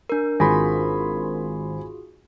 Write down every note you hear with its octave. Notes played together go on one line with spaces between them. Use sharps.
D4 A#4
G#1 F4 F#4 G#4 G#5 B5 C6